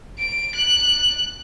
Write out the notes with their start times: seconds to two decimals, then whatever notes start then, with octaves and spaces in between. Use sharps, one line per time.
0.18 D7
0.55 F#6